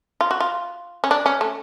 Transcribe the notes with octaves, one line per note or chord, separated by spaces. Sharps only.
F4
F#4
F4
C#4
D4
C#4
A3